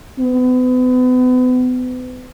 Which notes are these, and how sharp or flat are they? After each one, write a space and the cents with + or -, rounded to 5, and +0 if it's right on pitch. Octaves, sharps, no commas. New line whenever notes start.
B3 +40